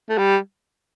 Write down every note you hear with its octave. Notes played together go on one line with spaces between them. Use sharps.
A3
G3